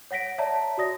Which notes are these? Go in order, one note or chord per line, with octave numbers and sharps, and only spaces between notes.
C#5 F#5 A#6 B6 D7
C#5 D5 E5 A5 A#5
F#4 D5 D#6 A#6